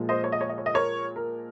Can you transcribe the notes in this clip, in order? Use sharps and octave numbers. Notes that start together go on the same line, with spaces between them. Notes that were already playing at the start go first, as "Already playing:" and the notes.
Already playing: A#2 F3 G#3
C5 D#5
C#5
D#5
C#5
D#5
C#5
D#5
A#4 C#5
A#4